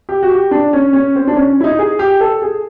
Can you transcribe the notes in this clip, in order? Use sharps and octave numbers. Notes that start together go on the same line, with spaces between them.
G4
F#4
G4
D4
C#4
C#4
C4
D4
C#4
E4
D#4
G#4
G4
A4
G#4